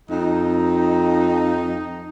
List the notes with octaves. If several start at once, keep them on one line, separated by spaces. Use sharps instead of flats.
F2 D#4